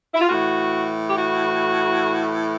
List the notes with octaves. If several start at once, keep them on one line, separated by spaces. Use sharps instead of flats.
E4
F4
A2 E3 F#4
G4
F#4